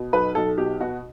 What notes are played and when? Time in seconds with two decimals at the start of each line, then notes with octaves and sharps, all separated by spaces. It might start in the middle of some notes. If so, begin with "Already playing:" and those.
Already playing: B2
0.13 B1 B4
0.35 B1 A4
0.58 B2 G4
0.80 B2 F#4